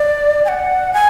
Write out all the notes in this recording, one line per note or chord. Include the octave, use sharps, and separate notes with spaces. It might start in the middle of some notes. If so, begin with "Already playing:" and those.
Already playing: D5
G#5
F#5
G#5